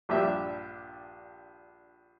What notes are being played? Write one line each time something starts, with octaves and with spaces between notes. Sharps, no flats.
A#1 G2 D4 G4 E5